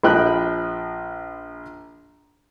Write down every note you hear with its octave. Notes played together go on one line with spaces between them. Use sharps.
A#1 F3 D#5 G5 B5 F#6